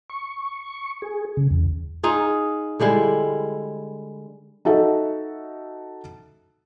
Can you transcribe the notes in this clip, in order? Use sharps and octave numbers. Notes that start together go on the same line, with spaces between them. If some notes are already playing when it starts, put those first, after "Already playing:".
C#6
G#4
C#3
E2
D#4 F4 G#4
D3 G3 G#3 E4
D#4 F#4 A4 E5